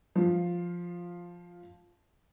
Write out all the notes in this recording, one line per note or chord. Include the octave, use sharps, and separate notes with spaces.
F3 F4